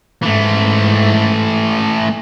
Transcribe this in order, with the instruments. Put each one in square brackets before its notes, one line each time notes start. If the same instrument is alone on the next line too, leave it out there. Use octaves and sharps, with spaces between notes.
[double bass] G#2 [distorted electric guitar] E3 A3